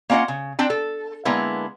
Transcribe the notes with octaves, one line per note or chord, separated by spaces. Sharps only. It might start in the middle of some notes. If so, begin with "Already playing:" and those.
A#3 C#4 F4 D#5 F#5
C#3
C4 D4 G5
A4
D3 G#3 A#3 B3 E4